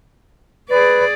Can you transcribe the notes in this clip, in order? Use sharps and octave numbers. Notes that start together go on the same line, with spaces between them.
G#4 B4 D5